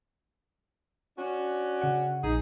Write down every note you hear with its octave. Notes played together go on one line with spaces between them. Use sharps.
C#4 D4 F#4
C#3 F#5
A#1 D#4 G#4